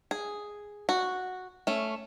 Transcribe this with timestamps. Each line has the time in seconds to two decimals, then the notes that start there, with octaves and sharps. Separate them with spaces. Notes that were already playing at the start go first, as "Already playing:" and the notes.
0.11 G#4
0.89 F#4
1.67 A3 C#4